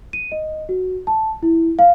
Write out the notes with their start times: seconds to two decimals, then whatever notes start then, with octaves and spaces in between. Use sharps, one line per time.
0.13 D#7
0.32 D#5
0.69 F#4
1.07 A5
1.43 E4
1.79 F5